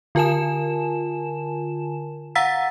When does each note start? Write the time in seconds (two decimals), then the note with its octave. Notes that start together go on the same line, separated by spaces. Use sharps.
0.15 D3 F4 A#4 G#5 A5 E7
2.35 F5 F#5 A#5 E6 A6 B6